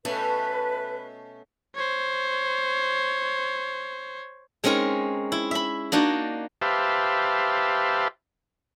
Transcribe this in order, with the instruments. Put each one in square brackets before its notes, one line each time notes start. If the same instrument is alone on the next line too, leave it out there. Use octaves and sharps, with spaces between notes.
[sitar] B2 A3 C#4 [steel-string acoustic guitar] A4 [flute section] B4
[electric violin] C5 C#5
[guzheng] G#3 C4 C#4 D#4 A#4
E4
E5 B5
A#3 D4 D#4 F#4
[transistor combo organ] G4 B4 C5 E5 F5 A5